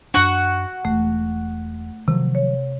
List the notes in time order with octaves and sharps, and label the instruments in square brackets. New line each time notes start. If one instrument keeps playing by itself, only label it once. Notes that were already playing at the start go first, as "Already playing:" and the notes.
[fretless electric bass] F#2 D4 [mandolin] F#4 F#5 C#6
[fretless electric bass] E1 [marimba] A3
[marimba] C3 [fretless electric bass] D#3 F3 F#3
[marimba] C#5